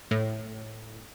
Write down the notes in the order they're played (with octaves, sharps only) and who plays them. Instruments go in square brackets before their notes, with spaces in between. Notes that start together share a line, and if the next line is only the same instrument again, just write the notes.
[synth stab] A2